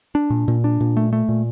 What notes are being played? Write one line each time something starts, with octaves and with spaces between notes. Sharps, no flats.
D4
A#2
A#2
D4
A#2
A3
A3
A#2